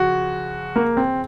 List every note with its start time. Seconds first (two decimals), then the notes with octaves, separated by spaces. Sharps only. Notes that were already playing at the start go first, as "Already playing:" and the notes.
Already playing: C#3 F3 F#4
0.76 A#3
0.97 C4